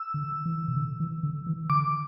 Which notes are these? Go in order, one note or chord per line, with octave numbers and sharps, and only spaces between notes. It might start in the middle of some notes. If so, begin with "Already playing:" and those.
Already playing: E6
D3
E3
B2
D3
E3
D3
E3
D3 D6